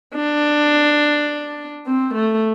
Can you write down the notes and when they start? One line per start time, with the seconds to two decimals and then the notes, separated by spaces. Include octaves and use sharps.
0.15 D4
1.86 C4
2.14 A3